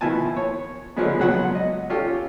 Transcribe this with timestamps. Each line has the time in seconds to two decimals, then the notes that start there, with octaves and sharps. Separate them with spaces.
0.01 B2 D#3 F3 E4 G#5 A5
0.37 C#5
0.96 D3 D#3 F3 F#3 G#3 B3
1.19 C#2 B2 F#3 F#5
1.55 D#5
1.90 C#4 F4 G4 A4